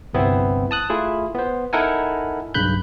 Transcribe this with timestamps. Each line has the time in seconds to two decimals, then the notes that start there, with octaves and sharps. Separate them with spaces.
0.13 G1 C2 B3 C4 E4
0.71 A5 D#6 F#6
0.90 A3 E4 F4 G#4
1.35 B3 C5
1.73 D#4 E4 A4 A#4 F#5 G#5
2.54 B1 G2 C#3 B5 F#6 G6